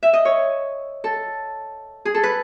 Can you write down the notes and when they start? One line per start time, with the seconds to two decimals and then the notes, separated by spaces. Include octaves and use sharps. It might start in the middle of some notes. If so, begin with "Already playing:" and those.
0.03 E5
0.13 D#5
0.25 C#5
1.04 A4
2.05 G#4
2.14 A4
2.23 B4